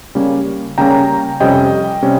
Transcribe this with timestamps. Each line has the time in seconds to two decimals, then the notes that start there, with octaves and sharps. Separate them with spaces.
0.15 C#3 G3 A#3 C#4
0.78 C#3 G3 A#3 C#4 G5 A#5
1.40 F2 C3 G3 C#4 D#5 G5
2.02 C3 G3 C#4